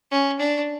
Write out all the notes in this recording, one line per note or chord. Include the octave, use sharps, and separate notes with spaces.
C#4
D4